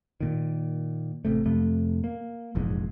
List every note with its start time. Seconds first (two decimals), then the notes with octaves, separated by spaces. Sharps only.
0.20 A#2 D#3
1.25 A1 C3 A3
1.46 F2 C3 A3
2.04 A#3
2.55 F1 A#1 E2 G#2